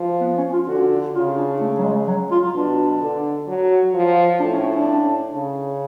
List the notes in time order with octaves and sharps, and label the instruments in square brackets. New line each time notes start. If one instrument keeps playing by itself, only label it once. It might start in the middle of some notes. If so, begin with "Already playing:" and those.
Already playing: [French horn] F3
[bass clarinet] B3
C#4
F4
[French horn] D3 [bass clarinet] F#4
[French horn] C#3 [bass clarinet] F4
[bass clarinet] D4
A3
F#3
G#3
F#3
F4
[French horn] B2 [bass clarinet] D4
[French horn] D3
F#3
F3
[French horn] A2 [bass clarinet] D4
[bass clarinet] C#4
C#4
D4
[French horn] C#3